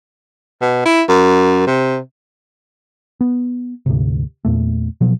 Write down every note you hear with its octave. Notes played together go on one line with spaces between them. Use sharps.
B2
E4
F#2
C3
B3
D2 G#2 C3
E2 A#2 A3
B2 F3 F#3